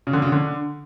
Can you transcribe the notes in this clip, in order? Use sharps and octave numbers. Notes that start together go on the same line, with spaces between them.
C#3
D3
C#3
D3